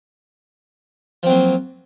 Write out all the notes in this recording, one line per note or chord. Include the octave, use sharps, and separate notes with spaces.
F3 F#3 A#3 C4